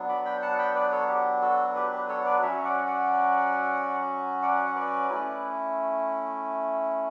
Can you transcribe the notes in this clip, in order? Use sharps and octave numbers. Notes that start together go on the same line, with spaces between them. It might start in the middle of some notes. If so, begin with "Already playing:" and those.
Already playing: F#3 B3 D4
B5 D6
G5 B5
F#5 A5
G5 B5
B4 D5
A4 C#5
G4
F#4 A4
G4 B4
G4 B4
A4 C#5
B4 D5
F#3 C#4 F#4 C#5 E5
D5 F#5
D5 F#5
D5 F#5
B4 D5
A3 C#4 E4